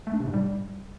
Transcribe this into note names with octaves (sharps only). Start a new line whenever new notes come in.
A3
D4
C3
G#2
G3